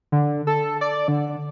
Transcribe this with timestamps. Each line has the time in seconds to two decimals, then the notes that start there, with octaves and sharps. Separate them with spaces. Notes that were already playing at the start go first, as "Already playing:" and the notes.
0.12 D3
0.47 A4
0.81 D5
1.08 D3